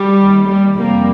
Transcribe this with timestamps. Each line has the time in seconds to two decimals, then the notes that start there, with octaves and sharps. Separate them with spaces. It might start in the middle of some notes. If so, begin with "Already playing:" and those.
Already playing: G3
0.20 D#2 D#3
0.49 G3
0.77 F2 C3 F3 G3 A#3